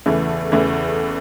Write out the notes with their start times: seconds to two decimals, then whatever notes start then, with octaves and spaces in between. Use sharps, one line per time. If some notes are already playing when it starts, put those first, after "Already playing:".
0.06 E2 C#3 E3 A3
0.52 E2 C#3 E3 A3